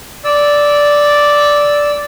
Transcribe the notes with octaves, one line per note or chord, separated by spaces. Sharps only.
D5 E6